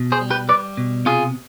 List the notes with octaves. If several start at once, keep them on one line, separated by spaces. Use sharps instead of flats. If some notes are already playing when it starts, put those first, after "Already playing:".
Already playing: B2
G#4 C5
G3
G4 B4
G3 B4 D5
B2
C3 F4 G#4